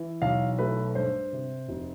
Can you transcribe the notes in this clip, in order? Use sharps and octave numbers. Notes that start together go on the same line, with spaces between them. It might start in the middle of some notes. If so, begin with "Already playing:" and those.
Already playing: E3
B1 F5
A3 B4
G2 C5
C3
F1